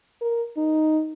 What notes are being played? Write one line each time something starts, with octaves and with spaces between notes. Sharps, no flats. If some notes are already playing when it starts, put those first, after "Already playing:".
A#4
D#4